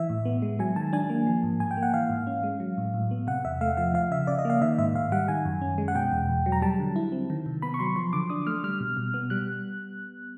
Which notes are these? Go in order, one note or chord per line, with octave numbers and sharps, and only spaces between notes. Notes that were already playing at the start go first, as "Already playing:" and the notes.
Already playing: E3 E5
A2
B3
G#3
F#3 G#5
D#3 A5
D4 G#5
A#3
F3
G#2
G#2 G#5
G5
A#3
F#5
E3 F5
G#2
C#4
G#3
F#3
A2
A2
B3
C3 F#5
E2 E5
A3 F5
F3 F5
F3 F5
C#3 E5
C#3 D5
D#5
A#3 F5
D#3 E5
G#2 E5
G#2 F5
G3 F#5
D#3 G#5
F#2
C#4
G#3
F#5
B2 G5
E2
E2
F#3
A#5
G3 A5
D3
E4
C4
D#3
C3
B3 B5
C#6
F#3 C6
F3 C6
D3 D6
D4 D#6
A3 F6
G3 F6
B2
B2
B3
G3 F#6